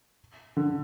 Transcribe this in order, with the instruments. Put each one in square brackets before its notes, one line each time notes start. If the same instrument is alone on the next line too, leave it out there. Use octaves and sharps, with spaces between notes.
[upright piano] D3